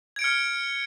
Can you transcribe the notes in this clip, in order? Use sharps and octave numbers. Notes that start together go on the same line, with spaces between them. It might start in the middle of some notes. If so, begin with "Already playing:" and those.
F6 G#6 C#7 D7